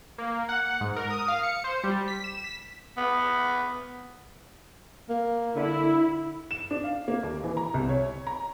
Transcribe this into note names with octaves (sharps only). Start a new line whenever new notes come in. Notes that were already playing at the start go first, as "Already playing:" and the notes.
A#3
F#5
G#2
A#4
D#6
F5
C#7
C5
G3
B6
E7
B6
B3
A#3
D3 E4
E7
D4
F5
A#3
D#2
E3
A#5
C2
C#5
A#5